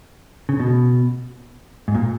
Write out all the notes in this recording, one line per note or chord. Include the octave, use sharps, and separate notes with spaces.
C#3
B2
G#2
A#2